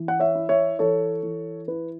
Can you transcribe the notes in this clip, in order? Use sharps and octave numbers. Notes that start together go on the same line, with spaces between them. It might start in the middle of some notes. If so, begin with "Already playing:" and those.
Already playing: E3
F#5
C#5 E5
E4
C#5 E5
E3 A4 C#5
E3
E4 B4